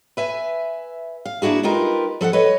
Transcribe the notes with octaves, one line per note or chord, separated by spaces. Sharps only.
B4 E5 G#5
F5
A#3 D4 E4 F#4 G#4
G#3 D#4 F4 G4 A#4 B4
F3 A4 F5 F#5
B4 C#5 D#5